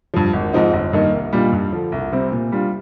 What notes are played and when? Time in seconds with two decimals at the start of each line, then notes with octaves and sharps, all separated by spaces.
0.14 G2 F3
0.33 G#1
0.53 G#2 F3 C4 D#4
0.73 G1
0.93 G2 D#3 A#3 D#4
1.13 C2
1.33 A#2 G3 D4 F4
1.52 G2
1.72 D3 F3
1.92 C2
2.12 C3 G3 C4
2.32 A#2
2.52 G3 D4 F4